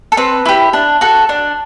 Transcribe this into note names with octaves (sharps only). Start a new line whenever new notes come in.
A4
C4 B4
E4 G4
D4
F#4 A4
D4